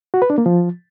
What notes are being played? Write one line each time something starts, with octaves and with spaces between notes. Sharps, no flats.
F#4
B4
D4
A#3
F3